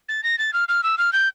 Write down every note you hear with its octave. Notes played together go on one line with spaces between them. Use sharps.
A6
A#6
A6
F6
F6
E6
F6
G6